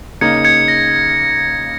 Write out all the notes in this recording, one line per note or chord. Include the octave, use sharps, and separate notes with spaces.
C#3 A#3 D#4 G#6 C#7
G#6 C#7
A#6